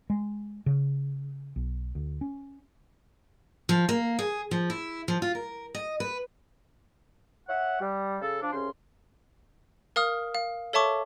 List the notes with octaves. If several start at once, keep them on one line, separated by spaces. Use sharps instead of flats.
G#3
C#3
B1
D2
C#4
F3
A#3
G#4
F3
E4
F3
F4
A#4
D#5
B4
C#5 E5 F#5
G3
C#3 A4
F3 D4
C2 C#3 C#4 C6
A#4 F5 D#6 F6
F5
A4 C#5 E5 A5 C#6 D6